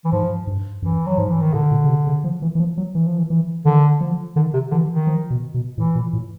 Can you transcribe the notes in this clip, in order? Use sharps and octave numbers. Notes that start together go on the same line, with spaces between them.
E3
G#2 F3
G2
F#2 E3
F#3
G#2 F3
E3
D#3
A2 D3
A#2
C#3
C3
C#3
F3
E3
E3
F3
F#3
E3
F3
E3
E3
D3 D#3
F3
D3 D#3
C3
D3 E3
D#3
F3
B2
B2
A2 E3
A#2
A2